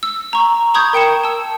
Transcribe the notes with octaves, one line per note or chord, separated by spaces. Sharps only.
E6
A#5 C#6
A#5 B5 C#6 D#6 G6 G#6
A#4 G5 C#7 E7
A5 E6